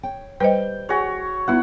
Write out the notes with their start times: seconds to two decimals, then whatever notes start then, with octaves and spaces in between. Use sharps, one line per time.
0.03 C#5 G5
0.40 G3 B4 C5 D#5 G5
0.89 F#4 G#4 C#5 G#5
1.48 B3 D#4 E4 F#4 F#5